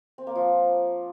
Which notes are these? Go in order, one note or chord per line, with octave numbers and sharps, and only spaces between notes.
C4
A#3
F3